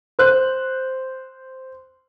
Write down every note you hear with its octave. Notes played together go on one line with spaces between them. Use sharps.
C5 F#6